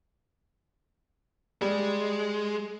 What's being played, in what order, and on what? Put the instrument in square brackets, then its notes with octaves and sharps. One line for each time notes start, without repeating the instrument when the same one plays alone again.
[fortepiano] G3 [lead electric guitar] G#3